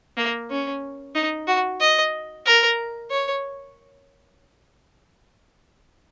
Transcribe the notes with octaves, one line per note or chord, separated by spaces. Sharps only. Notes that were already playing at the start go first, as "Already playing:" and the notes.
A#3
C#4
D#4
F#4
D#5
A#4
C#5